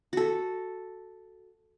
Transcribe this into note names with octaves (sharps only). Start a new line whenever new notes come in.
F#4 A4